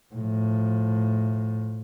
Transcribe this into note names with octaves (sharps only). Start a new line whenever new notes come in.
A2 F3